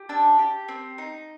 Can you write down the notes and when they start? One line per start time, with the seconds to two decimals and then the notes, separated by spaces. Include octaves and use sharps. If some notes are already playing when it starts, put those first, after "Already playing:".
Already playing: G4
0.09 D4 E6
0.39 G4
0.68 C4
0.98 D#4